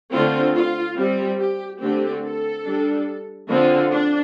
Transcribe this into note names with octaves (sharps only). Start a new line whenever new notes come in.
D3 A3 C4 F4
F4
G3 C4 G4
G4
D3 A3 C4 G4
A4
G3 D4
D3 F3 C4 F4
D4